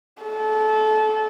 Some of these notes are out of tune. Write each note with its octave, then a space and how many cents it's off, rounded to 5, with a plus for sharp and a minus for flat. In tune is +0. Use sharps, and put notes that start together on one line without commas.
A4 -25